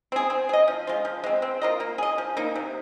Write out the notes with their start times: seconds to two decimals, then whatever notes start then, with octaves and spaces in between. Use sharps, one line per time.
0.12 C4 G#4
0.30 C4
0.49 G#4
0.53 D#5
0.68 F3
0.87 G#3 F4
1.05 F3
1.24 G#3 C4
1.42 C4
1.62 F4 A#4 D#5
1.80 A#3
1.98 G#4 D#5
2.18 F3
2.37 A#3 D#4
2.56 C3